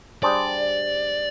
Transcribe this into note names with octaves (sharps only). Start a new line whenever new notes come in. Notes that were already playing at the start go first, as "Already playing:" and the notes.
G3 D4 G#4 C5 D5